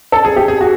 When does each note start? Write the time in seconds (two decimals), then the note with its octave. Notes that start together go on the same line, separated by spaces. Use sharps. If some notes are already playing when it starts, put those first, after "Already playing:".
0.12 A4
0.25 G#4
0.36 G4
0.48 G#4
0.61 F#4